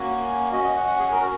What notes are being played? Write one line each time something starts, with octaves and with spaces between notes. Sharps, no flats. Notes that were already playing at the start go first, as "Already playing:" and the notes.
Already playing: A#3 C#4 F#4 G#5
C#4 F#4 D#5
D#5
F#5
F#5
G#4
A#4